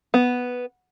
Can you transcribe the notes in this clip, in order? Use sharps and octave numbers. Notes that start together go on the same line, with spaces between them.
B3